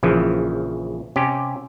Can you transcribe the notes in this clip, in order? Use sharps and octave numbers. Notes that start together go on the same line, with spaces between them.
A#1 C#3 E3 F3
C3 C#4 G4